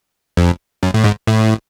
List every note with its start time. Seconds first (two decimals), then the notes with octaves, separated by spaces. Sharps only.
0.37 F2
0.83 F#2
0.94 A2
1.04 G#2
1.27 A2